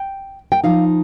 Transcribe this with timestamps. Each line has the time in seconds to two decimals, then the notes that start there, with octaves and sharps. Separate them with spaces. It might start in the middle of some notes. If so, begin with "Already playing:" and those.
Already playing: G5
0.52 G5
0.64 F3 D#4 F5